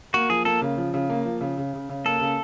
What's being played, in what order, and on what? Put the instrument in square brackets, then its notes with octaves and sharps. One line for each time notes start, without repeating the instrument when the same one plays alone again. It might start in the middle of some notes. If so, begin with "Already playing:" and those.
[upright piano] A#3 [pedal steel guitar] F#4
[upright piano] F3 [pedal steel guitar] G#4
[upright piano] A#3 [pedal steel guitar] A4
[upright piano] C#3
F3
C#3
A#3
F3
C#3
C#3
C#3
C#3
[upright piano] A#3 [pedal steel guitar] A4
[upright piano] C#3